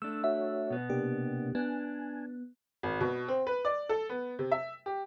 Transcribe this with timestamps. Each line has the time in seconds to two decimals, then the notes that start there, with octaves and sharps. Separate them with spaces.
0.02 A3 D4 E6
0.24 F#4 C#5 E5
0.70 B2 B3
0.90 C3 A#3 D4 G4
1.55 B3 D4 G#5
2.83 G#1
3.01 B2
3.28 C4
3.47 B4
3.65 D5
3.89 A4
4.09 B3
4.39 C3
4.52 E5
4.86 G4